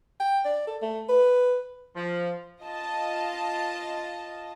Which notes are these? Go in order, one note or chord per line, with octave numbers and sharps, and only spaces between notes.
G5
D5
A4
A3
B4
F3
F4 D#5 A5